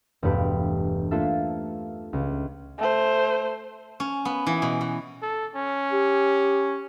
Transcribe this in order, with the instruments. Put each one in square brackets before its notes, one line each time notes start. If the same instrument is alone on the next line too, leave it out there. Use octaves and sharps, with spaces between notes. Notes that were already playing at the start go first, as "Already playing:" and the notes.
[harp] E1 G2 A3 G4 B4 D7
A3 A#3 D4 F4 A4 E5
C#2
[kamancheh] A3 C5
[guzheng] C#4
B3
E3
B2
B2
[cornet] A4
C#4
[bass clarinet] G4